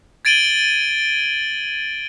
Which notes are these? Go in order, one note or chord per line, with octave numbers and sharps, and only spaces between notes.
G#6 A6 D7 D#7 F#7 G7